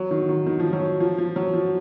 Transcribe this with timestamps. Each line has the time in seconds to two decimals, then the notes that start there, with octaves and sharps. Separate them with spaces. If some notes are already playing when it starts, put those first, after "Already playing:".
Already playing: F#3
0.11 D#3
0.29 D#3
0.46 D#3
0.60 F3
0.73 F#3
1.00 F3
1.18 F3
1.36 F#3
1.54 F3